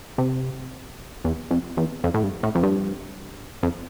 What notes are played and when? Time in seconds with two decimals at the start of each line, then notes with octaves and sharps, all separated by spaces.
0.18 C3
1.24 E2
1.51 F2
1.77 E2
2.04 F2
2.14 A2
2.24 G2
2.43 A2
2.55 F2
2.63 G2
3.63 F2